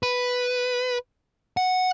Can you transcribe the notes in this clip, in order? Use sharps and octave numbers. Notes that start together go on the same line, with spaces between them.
B4
F#5